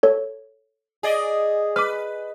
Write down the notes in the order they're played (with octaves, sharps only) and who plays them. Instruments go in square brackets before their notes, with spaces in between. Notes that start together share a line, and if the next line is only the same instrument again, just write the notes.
[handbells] A4 C#5
[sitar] G#4 D5 D#5
[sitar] B4 [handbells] D6 F6